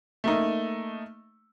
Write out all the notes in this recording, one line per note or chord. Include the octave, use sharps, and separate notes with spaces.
A3 A#3 D#4